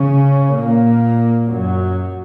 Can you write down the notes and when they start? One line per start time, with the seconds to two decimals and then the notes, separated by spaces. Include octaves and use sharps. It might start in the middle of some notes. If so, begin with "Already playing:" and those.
Already playing: C#3 C#4
0.54 A#2 A#3
1.48 F#2 F#3